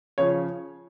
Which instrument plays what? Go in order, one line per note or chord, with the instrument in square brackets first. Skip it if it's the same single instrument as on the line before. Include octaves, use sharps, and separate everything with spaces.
[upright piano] C#3 F3 C#5